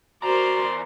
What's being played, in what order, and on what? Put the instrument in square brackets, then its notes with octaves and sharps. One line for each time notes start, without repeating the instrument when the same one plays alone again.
[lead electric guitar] E2 A#5 [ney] F#4 [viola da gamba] A#4 C5 [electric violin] D5 C6